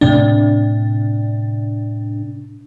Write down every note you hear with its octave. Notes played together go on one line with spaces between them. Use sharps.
A2 C3 D4